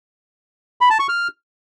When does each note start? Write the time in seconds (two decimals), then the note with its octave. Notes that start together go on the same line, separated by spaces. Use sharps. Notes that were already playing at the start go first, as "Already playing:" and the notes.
0.81 B5
0.90 A5
0.99 C#6
1.09 F6